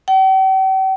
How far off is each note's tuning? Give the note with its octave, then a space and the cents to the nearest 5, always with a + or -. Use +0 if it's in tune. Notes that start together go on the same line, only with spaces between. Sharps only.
G5 -45